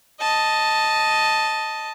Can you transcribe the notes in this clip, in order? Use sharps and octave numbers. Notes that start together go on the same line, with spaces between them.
D#5 A5